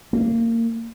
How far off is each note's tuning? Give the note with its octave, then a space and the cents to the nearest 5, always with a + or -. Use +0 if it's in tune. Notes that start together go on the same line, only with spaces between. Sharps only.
A#3 -25